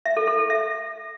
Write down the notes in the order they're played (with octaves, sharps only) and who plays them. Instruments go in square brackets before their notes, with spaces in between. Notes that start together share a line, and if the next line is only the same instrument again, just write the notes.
[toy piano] E5
A4
A4
A4
E5